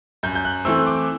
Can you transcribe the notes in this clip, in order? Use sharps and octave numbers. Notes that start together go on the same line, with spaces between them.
F#2 G6
G6
F#6
E3 A3 C4 E6
D6